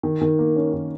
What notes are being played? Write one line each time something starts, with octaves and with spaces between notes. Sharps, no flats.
D#3
D#3
A#3
C#4
D#3